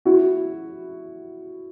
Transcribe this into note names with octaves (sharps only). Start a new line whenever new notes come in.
E4 F#4